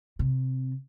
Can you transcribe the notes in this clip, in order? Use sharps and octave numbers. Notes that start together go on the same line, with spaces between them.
C3